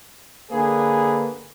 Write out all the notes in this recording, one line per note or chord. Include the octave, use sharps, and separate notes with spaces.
D3 A#3 G#4 B4